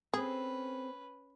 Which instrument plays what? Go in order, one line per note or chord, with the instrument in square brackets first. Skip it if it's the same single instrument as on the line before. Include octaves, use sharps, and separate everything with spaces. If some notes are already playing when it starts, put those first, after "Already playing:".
[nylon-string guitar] C4 A4 C5 [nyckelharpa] C#4 B4 [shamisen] G#4